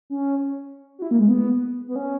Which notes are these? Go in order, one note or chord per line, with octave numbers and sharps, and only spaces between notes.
C#4
F#4
E4
A#3
G#3
B3
B3
C#4